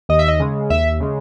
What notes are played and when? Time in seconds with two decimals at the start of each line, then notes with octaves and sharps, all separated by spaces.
0.09 D#2 D#5
0.19 E5
0.28 D#5
0.40 C#3 G#3
0.70 D#2 E5
1.00 C#3 G#3